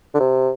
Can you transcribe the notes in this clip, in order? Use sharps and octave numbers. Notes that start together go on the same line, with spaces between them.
D3
C3